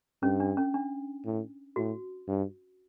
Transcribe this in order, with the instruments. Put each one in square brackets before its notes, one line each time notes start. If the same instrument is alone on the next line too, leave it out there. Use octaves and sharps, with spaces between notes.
[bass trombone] G2 [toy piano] C#4
[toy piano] D4
C#4
D4
[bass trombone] A2
[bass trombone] A2 [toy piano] F#4
[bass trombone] G2